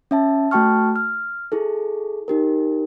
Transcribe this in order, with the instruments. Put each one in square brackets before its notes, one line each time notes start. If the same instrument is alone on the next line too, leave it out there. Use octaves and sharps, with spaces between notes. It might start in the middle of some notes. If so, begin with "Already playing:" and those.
[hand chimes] C#4 E5 A5
A3 F#4 G5 A5 C#6 F6
F6
E4 G#4 A4
D#4 G4 A#4